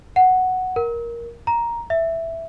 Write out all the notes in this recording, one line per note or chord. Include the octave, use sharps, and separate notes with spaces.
F#5
A#4
A#5
E5